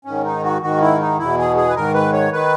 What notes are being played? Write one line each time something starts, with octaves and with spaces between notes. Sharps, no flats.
G#2 D#3 C#4
D#4
F#4
G#2 D#3 F#4
E4
D#4
E2 B2 E4
G#4
G#4
B4
G#2 D#3 A#4
B4
C#5
D#3 B4